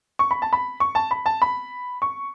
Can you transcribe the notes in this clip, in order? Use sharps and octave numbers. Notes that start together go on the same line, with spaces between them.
C#6
B5
A5
B5
C#6
A5
B5
A5
B5
C#6